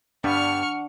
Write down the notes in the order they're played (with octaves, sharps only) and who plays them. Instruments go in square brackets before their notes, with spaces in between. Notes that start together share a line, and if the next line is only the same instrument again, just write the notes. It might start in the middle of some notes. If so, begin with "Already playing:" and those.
[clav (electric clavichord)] G2 G3 B3 [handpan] D4 [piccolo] F#5 [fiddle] C#6 F6